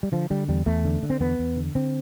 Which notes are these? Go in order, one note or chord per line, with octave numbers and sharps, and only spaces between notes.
G3
D3 F3
D3 G3
E2 G3
E2 A3
D3
D3
C4
E2 B3
E2
D3
D3 C4